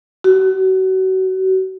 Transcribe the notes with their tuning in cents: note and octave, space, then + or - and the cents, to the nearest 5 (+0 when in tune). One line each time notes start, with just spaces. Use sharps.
F#4 +30